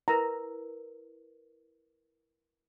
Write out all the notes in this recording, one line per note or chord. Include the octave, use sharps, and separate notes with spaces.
E4 A#4 B4 A#5